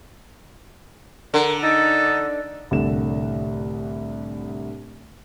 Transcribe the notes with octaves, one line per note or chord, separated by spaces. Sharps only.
D3 A#4
D#4 A4
C2 A2 D3 E7